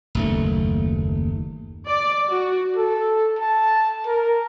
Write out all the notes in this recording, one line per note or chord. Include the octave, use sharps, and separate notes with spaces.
F#1 D#2 A3
D5
F#4
A4
A5
A#4